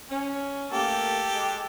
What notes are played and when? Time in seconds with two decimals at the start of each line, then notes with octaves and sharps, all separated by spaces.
0.10 C#4
0.72 A3 A#3 G4 A4
1.34 G#3